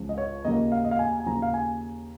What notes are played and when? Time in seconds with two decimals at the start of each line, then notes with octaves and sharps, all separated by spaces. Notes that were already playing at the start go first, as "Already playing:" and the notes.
Already playing: C#2 C#3 F3
0.09 D#5
0.18 C#5
0.45 D#2 C#3 F3 A#3 D#5
0.72 F5
0.84 D#5
0.91 F5
0.99 G#5
1.20 G#5
1.26 D#2 C#3 F3 A#5
1.42 F5
1.54 G#5